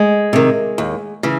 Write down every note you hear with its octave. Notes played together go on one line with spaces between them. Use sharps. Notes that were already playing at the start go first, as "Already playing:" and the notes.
Already playing: G#3
C3 D#3
D#2
C#3 E3